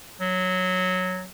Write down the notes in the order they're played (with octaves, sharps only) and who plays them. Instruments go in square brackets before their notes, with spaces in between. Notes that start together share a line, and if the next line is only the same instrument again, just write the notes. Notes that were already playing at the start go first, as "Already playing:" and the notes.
[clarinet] F#3